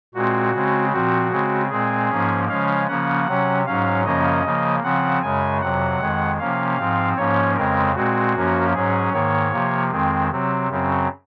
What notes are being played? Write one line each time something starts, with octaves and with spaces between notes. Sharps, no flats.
A#2 G#3 C4 F#4
C#3 G#3 C4
A#2 F3 C4 F#4
C#3 G#3 C4
A#2 G#3 C4 G#4
G#2 F3 A#3 C#4
C#3 F3 G#3 C#4 F5
C#3 F3 A#3 C#4 F#5
C3 F#3 C#4
G#2 F#3 C#4 F5
F#2 C#3 F3 A#3 C#4 D#5
C#3 F3 A#3
C#3 F3 C4 F#5
F#2 C#3 G#3 G#5
F2 C3 F#3 F#5
F2 D#3 G#3
C3 F3 A#3 C#4 F5
G#2 F3 C4
G#2 F3 A#3 C#4 C#5
F2 C#3 G#3 C4 A#4
A#2 G#3 C4 F#4
F#2 F3 A#3 C#4
G#2 F#3 C#4 G#4
G#2 D#3 A#3 C#5
C3 F3 A#3
F2 D#3 G#3 C4
C3 F#3 C4
F#2 C#3 F#3 C4